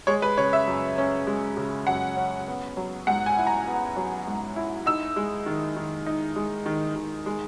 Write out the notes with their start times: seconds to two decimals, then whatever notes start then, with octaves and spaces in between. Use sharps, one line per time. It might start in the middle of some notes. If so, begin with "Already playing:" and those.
0.07 G#3 C#5
0.22 B4
0.38 C#3 C#5
0.53 E5
0.67 F#2
0.98 C#4
1.27 G#3
1.57 C#3
1.87 F#2 F#5
2.17 C#4
2.47 B3
2.77 F#3
3.07 G#2 F#5
3.26 G#5
3.37 E4
3.47 A#5
3.67 B3
3.96 F#3
4.27 G#2
4.56 E4
4.86 D#4 E6
5.16 G#3
5.46 D#3
5.76 D#3
6.06 D#4
6.36 G#3
6.66 D#3
6.96 D#3
7.26 G#3